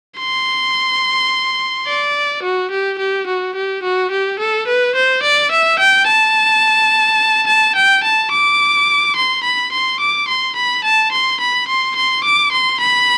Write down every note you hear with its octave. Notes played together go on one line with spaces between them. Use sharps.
C6
D5
F#4
G4
G4
F#4
G4
F#4
G4
A4
B4
C5
D5
E5
G5
A5
A5
G5
A5
D6
C6
B5
C6
D6
C6
B5
A5
C6
B5
C6
C6
D6
C6
B5